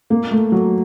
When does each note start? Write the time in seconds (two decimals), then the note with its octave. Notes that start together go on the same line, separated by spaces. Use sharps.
0.10 A#3
0.31 A3
0.52 F#3